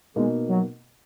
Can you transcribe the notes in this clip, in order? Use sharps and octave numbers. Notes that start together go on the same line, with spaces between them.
B2 G#3 A#3 D#4
F#3